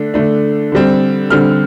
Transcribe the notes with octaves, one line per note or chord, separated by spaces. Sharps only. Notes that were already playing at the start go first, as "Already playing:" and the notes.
Already playing: D3 A3 D4
D3 A3 D4
D3 G3 C4
D3 G3 C4 F6